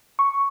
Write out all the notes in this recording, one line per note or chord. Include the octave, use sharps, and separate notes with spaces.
C#6